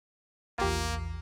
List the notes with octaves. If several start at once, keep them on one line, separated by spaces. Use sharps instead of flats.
A#1 E2 A#3 F4 G4